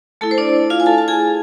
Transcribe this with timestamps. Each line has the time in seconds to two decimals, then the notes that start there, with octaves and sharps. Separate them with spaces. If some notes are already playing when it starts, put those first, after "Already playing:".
0.21 A3 E4 A4 A5
0.31 C5
0.38 D4 D5
0.70 F4 F5
0.80 G#5
0.86 A4 A5
0.98 A5
1.08 G#4 G#5